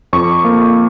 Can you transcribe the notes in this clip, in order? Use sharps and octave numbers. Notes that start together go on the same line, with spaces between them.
F2 C#6
A#3